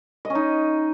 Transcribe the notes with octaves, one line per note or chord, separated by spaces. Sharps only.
D#5
C#4
D#4